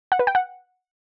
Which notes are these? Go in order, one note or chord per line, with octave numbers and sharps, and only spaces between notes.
F#5
B4
G5
F#5